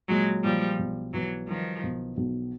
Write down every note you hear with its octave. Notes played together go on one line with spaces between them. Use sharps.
A#2 F#3 G#3
A#2 F3 G3
B1
B1 E3 F#3
D#3 F3 G3
B1
B1